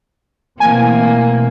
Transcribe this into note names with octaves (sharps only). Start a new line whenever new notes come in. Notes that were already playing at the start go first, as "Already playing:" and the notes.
B2 E3 A3 A#3 C4 G#5